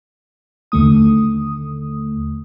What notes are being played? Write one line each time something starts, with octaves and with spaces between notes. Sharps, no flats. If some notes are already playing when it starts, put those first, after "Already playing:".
D#2 D3 A3 D#6